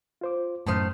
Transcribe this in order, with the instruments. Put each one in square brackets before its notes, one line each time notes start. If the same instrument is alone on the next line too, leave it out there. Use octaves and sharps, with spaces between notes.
[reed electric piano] F4 C5 D6
[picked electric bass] F#2 A2 [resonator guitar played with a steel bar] D#3 A3 C5 [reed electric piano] A5 D#6 F6